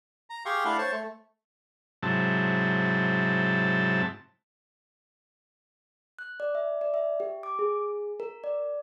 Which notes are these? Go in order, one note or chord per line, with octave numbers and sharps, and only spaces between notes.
A#5
G4 G#4 F5 C6 C#6
A3 D4 E4 F5 F#5
C5 C#5 A5
A3
G#2 C3 F#3 E4 A5
F#6
D5
E5
D5
E5
G4
D6
G#4
A#4
D5